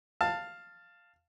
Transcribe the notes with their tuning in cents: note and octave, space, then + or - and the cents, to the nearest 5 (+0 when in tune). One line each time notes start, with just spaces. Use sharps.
F5 +0 A5 +15